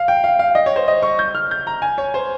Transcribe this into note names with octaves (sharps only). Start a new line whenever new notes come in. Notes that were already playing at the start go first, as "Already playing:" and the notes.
Already playing: F5
G5
F5
F5
D#5
C#5
C5
D#5
C#6
G6
F6
G6
A#5
G#5
C#5
C5